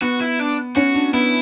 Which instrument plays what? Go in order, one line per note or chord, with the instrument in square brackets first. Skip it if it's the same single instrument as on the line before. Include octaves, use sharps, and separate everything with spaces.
[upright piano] B3 [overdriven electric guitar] F#4
[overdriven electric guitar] E4
D4
[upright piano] C#4 [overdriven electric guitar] F#4
[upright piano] D4
[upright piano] B3 [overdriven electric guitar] E4